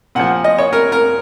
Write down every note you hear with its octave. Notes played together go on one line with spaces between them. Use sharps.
A#2 F3 F#5
D#5
C#5
A#4
A#4